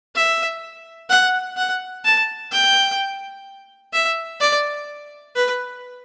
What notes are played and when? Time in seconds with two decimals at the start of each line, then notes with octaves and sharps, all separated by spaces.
0.15 E5
1.10 F#5
1.57 F#5
2.05 A5
2.51 G5
3.93 E5
4.40 D5
5.35 B4